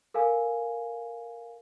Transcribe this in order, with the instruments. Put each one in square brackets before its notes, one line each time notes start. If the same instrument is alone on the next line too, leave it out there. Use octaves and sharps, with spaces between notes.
[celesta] A4 A#4 F5 G#5